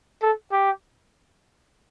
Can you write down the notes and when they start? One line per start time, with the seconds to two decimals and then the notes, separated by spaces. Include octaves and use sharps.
0.22 A4
0.52 G4